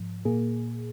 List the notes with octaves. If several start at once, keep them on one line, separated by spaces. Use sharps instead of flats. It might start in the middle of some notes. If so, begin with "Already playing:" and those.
Already playing: G#2 F3
A#2 A#3 G#4